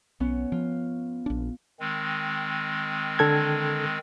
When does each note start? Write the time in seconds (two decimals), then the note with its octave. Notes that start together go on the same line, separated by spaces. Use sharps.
0.20 B1 B3 C#4
0.52 F3 B3 F4
1.26 A#1 D4
1.80 D#3 G#3 C4
3.19 D3 A4 G#6